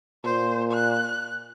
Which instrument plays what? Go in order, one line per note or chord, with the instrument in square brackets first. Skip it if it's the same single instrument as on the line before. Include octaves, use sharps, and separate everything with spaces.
[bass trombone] A#2 [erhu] C5
[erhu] F#6